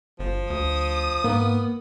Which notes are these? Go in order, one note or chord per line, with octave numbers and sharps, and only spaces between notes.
G1 F3
D2 D#6
G#2 A#3 B3